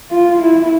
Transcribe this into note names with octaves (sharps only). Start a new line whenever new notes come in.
F4
E4